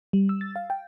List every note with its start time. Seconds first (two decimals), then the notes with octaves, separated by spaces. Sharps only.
0.13 G3
0.29 E6
0.41 A6
0.56 F5
0.70 G5